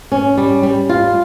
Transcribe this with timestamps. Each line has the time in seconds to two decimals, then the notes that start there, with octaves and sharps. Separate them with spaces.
0.12 C#4
0.37 G3
0.63 G3
0.89 F4